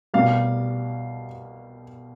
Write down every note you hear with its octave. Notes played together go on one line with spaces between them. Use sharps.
C2 B2 G3 F5